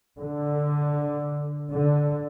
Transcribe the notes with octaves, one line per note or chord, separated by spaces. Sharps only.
D3
D3